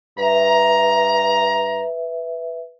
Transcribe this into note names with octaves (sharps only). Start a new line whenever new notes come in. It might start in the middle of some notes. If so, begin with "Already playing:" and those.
G2 B4 E5 A#5